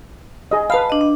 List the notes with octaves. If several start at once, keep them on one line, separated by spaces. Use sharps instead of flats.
G#4 D#5
B4 F5 A5 B5
D4 D#5
D4